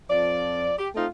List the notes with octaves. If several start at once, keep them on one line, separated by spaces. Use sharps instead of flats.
F2 F3 D5
G4
A3 C4 D#4 F4